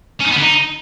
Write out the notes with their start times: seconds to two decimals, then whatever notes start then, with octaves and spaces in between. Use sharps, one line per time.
0.20 C#4
0.26 D#4
0.31 B3
0.36 D3
0.42 D#4